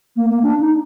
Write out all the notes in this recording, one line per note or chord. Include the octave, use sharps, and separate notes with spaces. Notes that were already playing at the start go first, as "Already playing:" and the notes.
A#3
A#3
D4
D#4